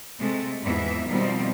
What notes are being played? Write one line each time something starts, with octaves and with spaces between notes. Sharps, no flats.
C3 G#3 A3
E2 G#2 E3 F3 E5
B2 D#3 F3 G3 C4